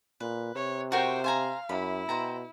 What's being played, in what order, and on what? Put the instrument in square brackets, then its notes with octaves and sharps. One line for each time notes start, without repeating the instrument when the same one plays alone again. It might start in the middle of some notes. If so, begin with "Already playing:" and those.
[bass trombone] A#2 [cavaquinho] B4
[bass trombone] C3 [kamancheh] C#5
[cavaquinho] F#4 A#4 C#5 [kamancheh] C5 G5
[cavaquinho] C5 G#5 A#5 [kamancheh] F5
[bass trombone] F#2 [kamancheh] E4 [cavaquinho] B5
[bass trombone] B2 [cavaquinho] C5 G5 A#5